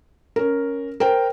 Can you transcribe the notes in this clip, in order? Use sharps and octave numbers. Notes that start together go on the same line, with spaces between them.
C#4 A#4
A#4 C5 G5